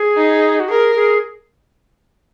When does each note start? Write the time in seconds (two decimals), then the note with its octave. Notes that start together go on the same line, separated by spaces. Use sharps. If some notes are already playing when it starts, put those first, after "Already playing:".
Already playing: G#4
0.17 D#4
0.59 F#4
0.68 G#4 A#4
0.95 G#4